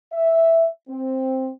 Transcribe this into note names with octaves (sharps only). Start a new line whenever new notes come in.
E5
C4